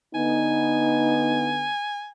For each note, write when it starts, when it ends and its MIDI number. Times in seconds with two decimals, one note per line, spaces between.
0.15 1.71 50
0.15 1.71 59
0.15 1.56 63
0.15 2.10 80